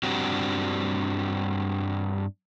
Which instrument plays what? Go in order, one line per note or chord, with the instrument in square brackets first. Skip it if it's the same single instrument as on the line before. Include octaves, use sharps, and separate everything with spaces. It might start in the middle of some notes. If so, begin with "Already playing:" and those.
[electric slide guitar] G2 C4 D4 F#4 G4